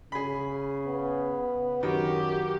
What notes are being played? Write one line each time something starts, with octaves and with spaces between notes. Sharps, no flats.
C#3 G#4 B5
B3
F#2 D#3 F#4 G4